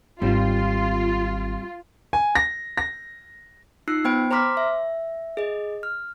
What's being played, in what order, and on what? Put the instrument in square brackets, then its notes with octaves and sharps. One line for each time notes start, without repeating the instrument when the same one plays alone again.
[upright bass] G#1 [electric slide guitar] G3 C4 [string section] F4
[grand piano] G#5
A#6
A#6
[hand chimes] D#4 F4 E6 F#6 C7
B3 C5 G5 B5 D7
C5 A#5 C6 D6 F6 B6
E5
G#4 D#5
F6